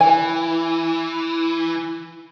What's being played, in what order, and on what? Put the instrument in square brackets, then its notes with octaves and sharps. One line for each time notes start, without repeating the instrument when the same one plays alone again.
[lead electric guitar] E3 [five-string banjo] G#5